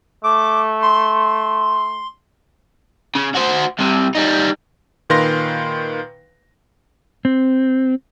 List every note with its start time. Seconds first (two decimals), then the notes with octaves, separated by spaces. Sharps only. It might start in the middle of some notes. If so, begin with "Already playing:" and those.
0.24 A3 D6
0.82 C6
3.15 C#3
3.35 F#4 C5
3.79 C2 C3
4.15 G3 D#4
5.10 A#2 D#3 B4 F5 C6 A#6
7.25 C4